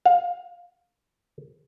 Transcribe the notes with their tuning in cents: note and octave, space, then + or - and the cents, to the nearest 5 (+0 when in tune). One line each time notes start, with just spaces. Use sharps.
F5 +20